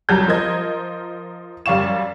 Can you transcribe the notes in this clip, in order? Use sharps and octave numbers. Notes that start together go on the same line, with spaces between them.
C2 F#3 G3 A5 A#5 G6
F3 A#4 C5 D#5 G#6
F#2 G3 D5 F5 C#6 E7